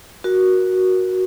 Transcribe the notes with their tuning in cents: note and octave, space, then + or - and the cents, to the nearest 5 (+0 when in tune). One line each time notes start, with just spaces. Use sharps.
F#4 +0 A#4 +25